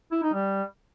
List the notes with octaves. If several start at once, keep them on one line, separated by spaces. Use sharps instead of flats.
E4
D#4
G3